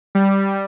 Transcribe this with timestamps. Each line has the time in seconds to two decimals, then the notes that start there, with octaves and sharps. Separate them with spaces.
0.15 G3